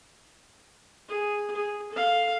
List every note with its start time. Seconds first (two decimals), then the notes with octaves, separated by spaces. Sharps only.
1.09 G#4
1.56 G#4
1.92 A4 F5